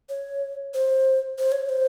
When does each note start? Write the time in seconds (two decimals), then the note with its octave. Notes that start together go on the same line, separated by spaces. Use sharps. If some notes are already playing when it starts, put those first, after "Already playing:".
0.09 C#5
0.74 C5
1.39 C5
1.52 C#5
1.65 C#5
1.69 C5